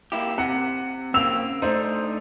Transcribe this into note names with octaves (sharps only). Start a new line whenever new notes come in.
A#3 E4 G4
C3 F#5
C#3 A#3 C4 E6 F7
A3 D4 D#4 C5